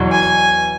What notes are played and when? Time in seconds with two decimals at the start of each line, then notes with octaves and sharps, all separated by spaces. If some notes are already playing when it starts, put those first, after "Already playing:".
Already playing: E2 B2 F#3
0.11 G#5